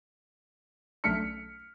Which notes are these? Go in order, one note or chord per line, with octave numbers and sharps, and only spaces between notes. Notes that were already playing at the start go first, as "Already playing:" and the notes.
B1 A3 D4 F6 B6 C#7